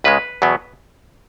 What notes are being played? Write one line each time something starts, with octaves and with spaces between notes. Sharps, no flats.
C#2 C#3 G#3 B4
E2 B2 F#3 B3